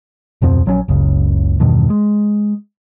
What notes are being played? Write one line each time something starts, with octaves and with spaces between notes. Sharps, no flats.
D1 F2 B2 C4
A#1 F#3 G3 C#4
F#1 C#2 C#3
E2 G2 B2 D#3
G#3